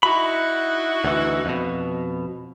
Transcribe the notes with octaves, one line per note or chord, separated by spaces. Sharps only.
D#4 E4 F#4 B5
D2 E3
F2 B2